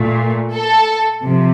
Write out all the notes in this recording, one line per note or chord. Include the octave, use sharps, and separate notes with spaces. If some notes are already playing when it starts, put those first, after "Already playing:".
Already playing: A#2 A3
A4
C3 F3